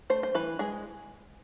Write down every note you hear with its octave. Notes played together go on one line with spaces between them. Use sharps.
A3 C5
C5
E3 B4
G#3 G#4